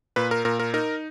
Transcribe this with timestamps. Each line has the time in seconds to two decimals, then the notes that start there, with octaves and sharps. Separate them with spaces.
0.16 A#2 B4
0.31 A#4
0.45 A#2 A#4
0.59 A#4
0.74 D#4 A#4